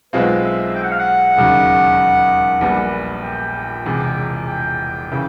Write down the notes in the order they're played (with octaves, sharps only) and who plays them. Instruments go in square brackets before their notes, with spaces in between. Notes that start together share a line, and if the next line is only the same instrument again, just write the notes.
[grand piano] B1 B2 G#3 C4 F4 [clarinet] B4
[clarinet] E5
G5
F#5
F5
F#5
[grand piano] E1 D#2 C#3 F#3
A#1 A#2 G3 B3
[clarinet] G5
[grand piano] E1 E2 C3
[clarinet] G5
[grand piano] C#3 E3